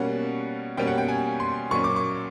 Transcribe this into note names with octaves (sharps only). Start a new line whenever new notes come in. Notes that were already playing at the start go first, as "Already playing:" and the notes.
Already playing: B2 G3 A#3 C#4 F#5
B2 G3 A#3 C#4 G5
F#5
G5
G#5
C6
A#2 F#3 A#3 C#4 C#6
D6
C#6